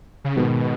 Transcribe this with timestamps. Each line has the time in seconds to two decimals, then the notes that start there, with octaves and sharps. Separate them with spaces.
0.24 C#3
0.36 G#2 B2 D#3 G#3 B3